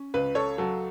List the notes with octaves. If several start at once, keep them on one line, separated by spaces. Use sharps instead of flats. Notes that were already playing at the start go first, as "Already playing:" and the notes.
Already playing: C#4
C#2 B4
A4 C#5
F#3 A4